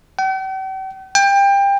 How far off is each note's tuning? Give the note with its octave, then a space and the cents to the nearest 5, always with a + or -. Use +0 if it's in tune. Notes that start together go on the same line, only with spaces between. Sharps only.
G5 -45
G5 +25